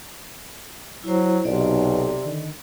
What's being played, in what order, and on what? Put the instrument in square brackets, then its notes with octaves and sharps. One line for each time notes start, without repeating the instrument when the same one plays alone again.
[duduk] F#3 [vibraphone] E4 C5
[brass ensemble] B1 [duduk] C3 [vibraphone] D5
[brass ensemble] D3 D#3